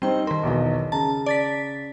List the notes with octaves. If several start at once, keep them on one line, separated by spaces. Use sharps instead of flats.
G3 C4 D#4 C5 G5
D#3 A#4 C6
B1 E2 D#5
C#3 A5 A#5
D5 A6 B6